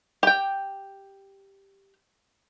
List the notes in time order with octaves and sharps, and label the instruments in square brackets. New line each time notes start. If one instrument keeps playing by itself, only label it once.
[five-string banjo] G4 G5